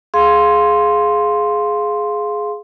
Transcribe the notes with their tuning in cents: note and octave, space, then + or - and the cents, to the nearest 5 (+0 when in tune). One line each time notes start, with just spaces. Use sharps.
G#4 +10 F5 +0 C6 +0